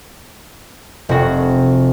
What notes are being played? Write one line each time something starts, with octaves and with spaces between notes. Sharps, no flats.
F1 F#4